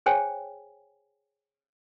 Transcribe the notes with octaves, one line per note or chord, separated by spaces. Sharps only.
G#4 C5 C#5 G5 G#5